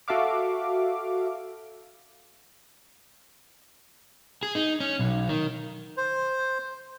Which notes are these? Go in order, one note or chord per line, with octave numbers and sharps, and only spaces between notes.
F#4 A4 E5 F5 D6
G#4
D#4
C#4
B1
D#3
C5